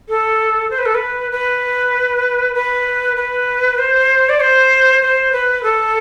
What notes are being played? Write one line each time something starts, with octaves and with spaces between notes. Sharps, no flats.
A4
C5
B4
A4
B4
B4
B4
B4
C5
D5
C5
C5
B4
A4